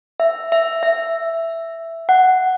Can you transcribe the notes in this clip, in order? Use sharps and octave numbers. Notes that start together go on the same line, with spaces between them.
E5
E5
E5
F#5